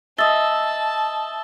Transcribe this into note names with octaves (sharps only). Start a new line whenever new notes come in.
D#5 E5 A5 E6 A6 G7